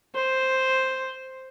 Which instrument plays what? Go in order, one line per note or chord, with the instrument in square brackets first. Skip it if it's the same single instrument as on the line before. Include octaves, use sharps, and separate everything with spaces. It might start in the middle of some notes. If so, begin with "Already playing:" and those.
[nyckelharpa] C5